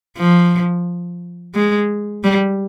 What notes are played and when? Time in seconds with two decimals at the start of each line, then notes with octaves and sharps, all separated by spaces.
0.18 F3
1.55 G#3
2.24 G3